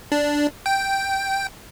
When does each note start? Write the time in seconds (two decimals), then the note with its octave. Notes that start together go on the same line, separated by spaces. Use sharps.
0.12 D4
0.66 G5